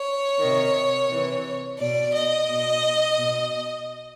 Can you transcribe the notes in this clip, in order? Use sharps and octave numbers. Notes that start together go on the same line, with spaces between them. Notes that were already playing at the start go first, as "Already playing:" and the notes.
Already playing: C#5
C3 D#3
C3 E3
B2 D5
D#5
B2
B2